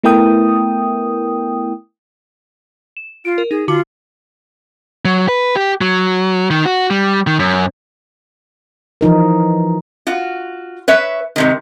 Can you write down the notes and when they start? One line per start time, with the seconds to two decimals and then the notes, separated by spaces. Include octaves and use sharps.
0.04 A3 B3 E4 A#4 G5 D#6
2.97 E7
3.25 F4 D7
3.38 A#4
3.51 D#4 G#4
3.68 D3 F4 F#4 D6
5.05 F#3
5.29 B4
5.56 G4
5.81 F#3
6.50 D#3
6.65 F#4
6.90 G3
7.27 D#3
7.39 F#2
9.01 E3 F3 D#4 A#4
10.07 F4 F#4
10.88 B4 C#5 E5
11.36 G#2 C3 D#3